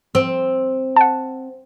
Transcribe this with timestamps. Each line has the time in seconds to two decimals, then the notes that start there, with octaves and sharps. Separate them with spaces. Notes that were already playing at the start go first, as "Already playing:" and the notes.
0.15 C4
0.96 F#5 A5